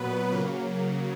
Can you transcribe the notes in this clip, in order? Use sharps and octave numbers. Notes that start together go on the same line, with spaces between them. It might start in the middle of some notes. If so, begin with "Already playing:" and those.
Already playing: A#2 F#3 B3 B4
C#3 F#3 A#3